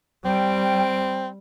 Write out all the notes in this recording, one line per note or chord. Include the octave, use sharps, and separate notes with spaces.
G3 C4 G5